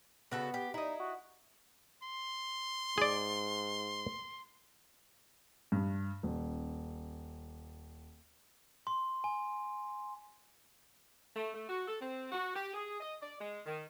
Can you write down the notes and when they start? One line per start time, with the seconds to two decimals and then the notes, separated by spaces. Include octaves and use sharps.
0.31 C#3 B3 F#4 A4
0.54 G4
0.74 D#4 E4 D#5
1.00 F#4
2.03 C6
2.98 G#2 G#4 D5
5.72 G2
6.23 D#1
8.87 C6
9.24 G#5
11.36 A3
11.54 A3
11.69 F#4
11.87 A4
12.01 C4
12.32 F#4
12.55 G4
12.74 G#4
13.00 D#5
13.21 D5
13.39 G#3
13.66 D#3